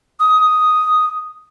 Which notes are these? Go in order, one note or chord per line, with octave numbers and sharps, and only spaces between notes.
D#6